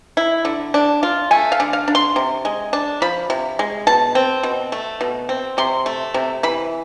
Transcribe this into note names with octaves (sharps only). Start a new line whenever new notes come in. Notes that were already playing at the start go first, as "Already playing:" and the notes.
E4
D3
D4
F4
A3 G#5
F5
D3
F5
D4
C6
C3
G#3
D4
F3 B5
C3
G#3
B2 A5
C4
B2
A3
B2
C4
C3 C6
A3
C3
E3 B5